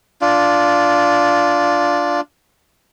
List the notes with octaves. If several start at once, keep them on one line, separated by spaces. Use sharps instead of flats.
D4 F4